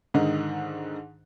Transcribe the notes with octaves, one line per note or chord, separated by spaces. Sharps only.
G#2 D3 D#3 D#4